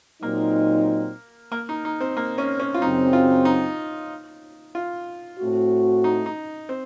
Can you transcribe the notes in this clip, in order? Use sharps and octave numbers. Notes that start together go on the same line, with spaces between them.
A#2 F#3 A#3 C4 D#4
A#3
D#4
D#4
C4
A#3
C#4
C#4
F4
F#2 C#3 F#3 C4 D#4
F4
D#4
F4
A2 A3 C4 F#4
D#4
D#4
C4